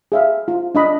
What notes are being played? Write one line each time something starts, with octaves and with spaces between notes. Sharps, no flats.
G#4 E5 F5
F4
D4 D#5 B5